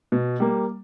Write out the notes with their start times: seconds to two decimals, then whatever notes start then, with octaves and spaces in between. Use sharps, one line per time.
0.12 B2
0.40 G3 A#3